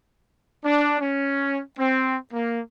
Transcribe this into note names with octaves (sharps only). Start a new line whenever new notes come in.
D4
C#4
C4
A#3